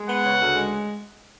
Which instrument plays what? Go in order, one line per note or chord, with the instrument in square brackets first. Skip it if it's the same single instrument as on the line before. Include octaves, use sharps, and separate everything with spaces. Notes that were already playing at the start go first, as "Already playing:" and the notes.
Already playing: [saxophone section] G#3
[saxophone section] B3 [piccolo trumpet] F#5
[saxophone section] C#3
D2
G#3